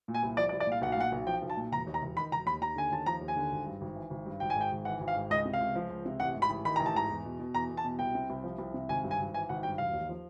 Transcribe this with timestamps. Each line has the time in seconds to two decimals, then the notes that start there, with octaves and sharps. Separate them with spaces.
0.08 A#2
0.14 G#5
0.23 C2
0.37 F3 D5
0.49 D5
0.53 C2
0.60 D5
0.67 A#2 F5
0.82 B1 F#5
0.92 F5
0.97 A#2 F#5
1.12 B1
1.26 F3 G5
1.42 B1
1.50 A5
1.57 A#2
1.72 E1 A#5
1.87 D#2
1.94 A#5
2.02 E1
2.16 D#3 B5
2.32 E1 A#5
2.46 D#2 B5
2.61 D#2 A#5
2.76 D3 G#5
2.91 D#2 A5
3.06 F3 A#5
3.21 D#2
3.28 G#5
3.36 D3
3.52 G#1
3.66 G2
3.81 G#1
3.95 E3
4.10 G#1
4.26 G2
4.40 G#1 G5
4.50 G#5
4.55 G#2
4.61 G5
4.71 G#1
4.85 E3 F#5
5.00 G#1
5.08 F5
5.16 G#2
5.30 C#2 D#5
5.45 C3
5.53 F5
5.60 C#2
5.75 F3
5.90 C#2
6.06 C3
6.20 A1 F#5
6.35 G#2
6.42 B5
6.50 A1
6.65 D#3 B5
6.76 A1 A#5
6.86 A5
6.95 G#2 A#5
7.09 E2
7.25 B2
7.39 B2
7.54 E2 A#5
7.70 E2
7.77 A5
7.84 B2
7.99 C2 G5
8.15 C3
8.30 C2
8.44 F3
8.58 C2
8.74 C3
8.89 G#1 G#5
9.04 G2
9.11 G#5
9.19 G#1
9.34 E3 G#5
9.49 G#1 F#5
9.63 G2 G5
9.78 E1 F5
9.93 D#2
10.09 F3